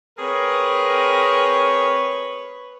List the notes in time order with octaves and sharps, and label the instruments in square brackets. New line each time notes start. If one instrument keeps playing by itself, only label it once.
[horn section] C4 G#4 A#4 [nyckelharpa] B4 C#5